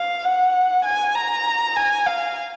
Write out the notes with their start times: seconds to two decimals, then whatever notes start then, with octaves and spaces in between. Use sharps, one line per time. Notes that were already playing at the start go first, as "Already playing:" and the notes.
Already playing: F5
0.25 F#5
0.85 G#5
1.15 A#5
1.76 G#5
2.07 F5